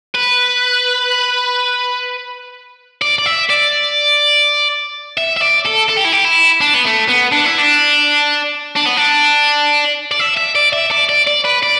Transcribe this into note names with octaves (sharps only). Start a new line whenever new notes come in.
B4
D5
D5
E5
D5
E5
E5
D5
A4
A4
G4
E4
G4
E4
D4
B3
A3
B3
D4
E4
D4
D4
B3
D4
D5
E5
E5
D5
E5
D5
D5
D5
B4
D5